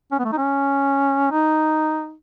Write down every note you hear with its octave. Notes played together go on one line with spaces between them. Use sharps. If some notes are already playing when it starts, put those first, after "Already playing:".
C#4
B3
A3
D#4
C#4
D#4